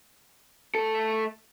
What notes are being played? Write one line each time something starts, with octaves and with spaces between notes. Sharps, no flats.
A3 A4